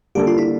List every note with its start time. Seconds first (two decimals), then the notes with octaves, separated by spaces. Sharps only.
0.15 D3 G3 A#3 D4 G4 A4
0.27 F4
0.38 E4